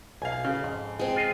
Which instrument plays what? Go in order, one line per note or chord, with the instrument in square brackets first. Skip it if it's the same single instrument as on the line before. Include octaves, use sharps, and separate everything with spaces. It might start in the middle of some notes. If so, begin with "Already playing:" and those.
[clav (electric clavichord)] B1 [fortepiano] F5 G#5
[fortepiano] C#3
[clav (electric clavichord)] F2 G#2
[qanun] G#3 C4
[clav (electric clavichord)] F4 D#5 F5